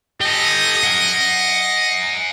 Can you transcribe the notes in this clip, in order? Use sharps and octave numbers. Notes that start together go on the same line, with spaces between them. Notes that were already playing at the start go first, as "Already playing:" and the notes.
G4 A4 D#5
F#5 G#5